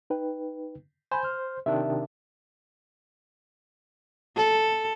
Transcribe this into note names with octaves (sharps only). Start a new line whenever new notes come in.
D#4 B4 G5
C5 G#5 B5 G6
F6
C3 D#3 D4 E5
A4